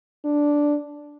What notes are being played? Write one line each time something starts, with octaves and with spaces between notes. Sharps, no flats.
D4